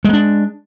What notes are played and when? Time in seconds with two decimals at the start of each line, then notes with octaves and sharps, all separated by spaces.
0.04 G#3
0.09 A#3
0.13 D4